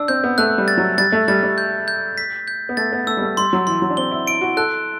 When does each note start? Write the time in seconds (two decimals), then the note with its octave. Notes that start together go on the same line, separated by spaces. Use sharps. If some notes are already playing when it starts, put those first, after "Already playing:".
Already playing: D4 E6
0.08 C4 G6
0.24 B3
0.38 A3 F#6
0.58 G3
0.68 A6
0.78 F#3
0.98 G3 A6
1.12 A3
1.28 G3 A6
1.43 G3
1.58 G6
1.88 G6
2.18 B6
2.48 G6
2.69 B3
2.77 A3 A6
2.92 B3
3.07 A3 E6
3.17 G3
3.22 A3
3.37 G3 C6
3.53 F#3
3.67 E3 C6
3.82 F#3
3.90 D4
3.97 C4 G7
4.11 E4
4.26 E4 D7
4.41 F#4
4.57 A4 F#6